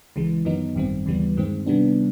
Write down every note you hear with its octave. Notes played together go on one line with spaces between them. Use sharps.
C#2 C#3 E3 G#3
F#2 D#3 F#3 B3 D#4
G#1 F#2 D#3 G3 C4
D#2 C#3 E3 G3 B3
G2 D#3 G#3 C4
C3 D#3 G3 B3 D4